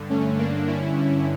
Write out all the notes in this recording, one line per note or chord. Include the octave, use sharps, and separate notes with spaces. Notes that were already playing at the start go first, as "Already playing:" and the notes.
Already playing: G2 D3
A3 C#4
A#3 D4
C#4 E4